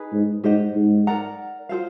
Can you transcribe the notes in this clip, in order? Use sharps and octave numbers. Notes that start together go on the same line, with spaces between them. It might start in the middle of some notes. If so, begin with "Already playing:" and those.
Already playing: D#4 G#4 B4
G#2
G#2 G4 C5 D#5 F#5
G#2
A#4 D5 F#5 A#5
F4 A4 C5 F5